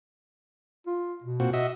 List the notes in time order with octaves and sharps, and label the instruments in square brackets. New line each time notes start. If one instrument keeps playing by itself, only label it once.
[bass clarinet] F4
B2
[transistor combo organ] A#2 C4 F#4
F#4 D#5 E5